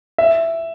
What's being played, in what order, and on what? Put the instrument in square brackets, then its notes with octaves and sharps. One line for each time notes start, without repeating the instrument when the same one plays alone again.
[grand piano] E5